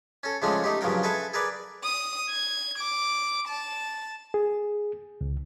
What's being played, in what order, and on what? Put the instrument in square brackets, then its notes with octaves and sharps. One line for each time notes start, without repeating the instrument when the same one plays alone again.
[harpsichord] C#4 A4
C#3 F3 G#3 A3 C#4 D4
A3 D#4 G4
G2 C#3 F3 F#3 A#4 G5
G#4 A4 B4 E5 A5
G#4 A#4 B4 D5
[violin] D#6
G#6
D6
A5
[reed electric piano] G#4
C#2